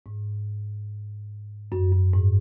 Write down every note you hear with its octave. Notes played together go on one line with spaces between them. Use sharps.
G#2
F#2
F#2
G#2